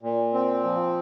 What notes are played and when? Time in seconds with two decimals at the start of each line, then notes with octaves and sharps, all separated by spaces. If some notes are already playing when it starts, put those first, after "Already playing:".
0.02 A#2
0.34 C4
0.64 F3